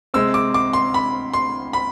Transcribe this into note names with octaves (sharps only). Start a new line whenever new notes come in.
C3 G#3 C4 E6
D6
D6
C6
B5
C6
B5